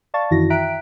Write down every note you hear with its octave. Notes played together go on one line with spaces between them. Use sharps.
D5 F5 A5 C#6 A6
F#2 D#3 E3 E4 F#4 A#6
E5 G5 A#5 F#6 B6 D7